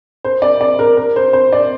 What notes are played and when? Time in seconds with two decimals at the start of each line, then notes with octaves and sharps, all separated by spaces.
0.24 C5
0.42 D5
0.61 D5
0.79 A#4
0.97 A#4
1.16 C5
1.33 C5
1.53 D5